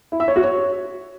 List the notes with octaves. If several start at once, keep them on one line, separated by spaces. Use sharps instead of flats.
E4
E5
C#5
F#4
C#5